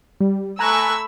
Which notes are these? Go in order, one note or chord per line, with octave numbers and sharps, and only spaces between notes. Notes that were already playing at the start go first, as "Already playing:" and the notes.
G3
A3 G#5 A#5 B5 C#6 E6 F#6